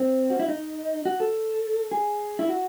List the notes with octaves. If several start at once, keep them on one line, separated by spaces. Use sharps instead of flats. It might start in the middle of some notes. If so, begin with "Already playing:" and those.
Already playing: C4
F#4
E4
D#4
F#4
A4
G#4
E4
F#4